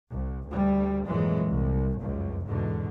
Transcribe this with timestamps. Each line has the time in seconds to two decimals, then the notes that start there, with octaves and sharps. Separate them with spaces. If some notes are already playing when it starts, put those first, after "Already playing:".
0.11 C2
0.48 D2 G3
1.05 G#1 F2 A#2 E3 F#3 G#3
1.46 C2
1.99 F1 C#2 F#2
2.46 E2 G#2 B2 D3